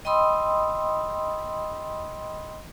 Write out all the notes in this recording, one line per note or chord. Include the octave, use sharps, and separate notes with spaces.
D#5 G5 B5 C6 D#6 E6